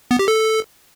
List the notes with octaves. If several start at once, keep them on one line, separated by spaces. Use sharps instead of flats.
B3
G4
A4